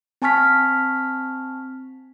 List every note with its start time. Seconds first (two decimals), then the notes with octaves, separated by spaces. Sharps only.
0.22 C4 G#5 A5 C#6 F6 B6